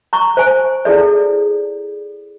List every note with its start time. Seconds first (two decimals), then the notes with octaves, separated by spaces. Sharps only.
0.13 A#5 C#6
0.37 C5 G#5
0.85 E4 G#4 A4 D5